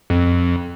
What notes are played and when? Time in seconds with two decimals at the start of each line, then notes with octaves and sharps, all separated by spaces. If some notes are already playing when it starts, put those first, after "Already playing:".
0.10 F2